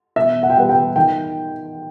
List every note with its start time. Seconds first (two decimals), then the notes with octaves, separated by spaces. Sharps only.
0.16 B2 E5
0.43 F#5
0.50 G5
0.56 G3 B3 F#5
0.69 G5
0.96 D#3 G5